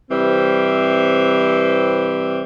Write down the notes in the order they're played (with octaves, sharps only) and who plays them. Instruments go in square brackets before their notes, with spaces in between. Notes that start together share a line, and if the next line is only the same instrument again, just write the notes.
[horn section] C3 E3 G3 C4